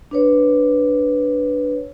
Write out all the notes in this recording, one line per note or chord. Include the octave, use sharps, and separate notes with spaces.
D4 B4 C#5